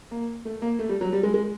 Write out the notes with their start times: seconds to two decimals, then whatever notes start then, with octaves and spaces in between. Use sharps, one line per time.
0.11 A#3
0.45 A3
0.62 A#3
0.79 A3
0.89 G3
1.01 F#3
1.12 G3
1.23 G#3
1.34 G#3